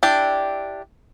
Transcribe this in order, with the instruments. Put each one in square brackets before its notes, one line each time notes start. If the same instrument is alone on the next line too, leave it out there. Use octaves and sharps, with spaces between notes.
[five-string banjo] D4 E4 G4